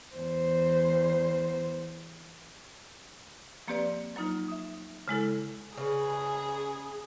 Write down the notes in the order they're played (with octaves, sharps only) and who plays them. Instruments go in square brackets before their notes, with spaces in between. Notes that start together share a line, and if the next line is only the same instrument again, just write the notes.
[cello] E2 C5
[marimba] F3 A#3 C4 G4 B4 D5
F#3 A#3 D#4 F4
E5 D#6
C#3 G#3 E4 A4
[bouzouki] C#3 B4 [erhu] G#4